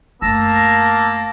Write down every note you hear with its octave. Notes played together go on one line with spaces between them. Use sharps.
F#2 A3 A#3 A5 E6 A#6